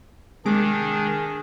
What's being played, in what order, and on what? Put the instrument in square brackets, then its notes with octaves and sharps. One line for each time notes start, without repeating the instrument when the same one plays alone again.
[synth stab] C3 G#3 D6 [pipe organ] D#3 D4 [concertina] G#4